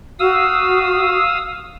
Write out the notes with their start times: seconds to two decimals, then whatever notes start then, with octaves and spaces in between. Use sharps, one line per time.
0.19 F#4 F5 D#6 E6